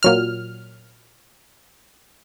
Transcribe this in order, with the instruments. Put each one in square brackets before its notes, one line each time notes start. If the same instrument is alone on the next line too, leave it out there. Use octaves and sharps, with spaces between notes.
[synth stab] A#2 F#3 F6